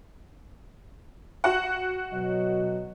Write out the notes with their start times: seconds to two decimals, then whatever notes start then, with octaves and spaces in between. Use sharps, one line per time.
1.44 F#4 F#5
2.13 B2 F#3 D#5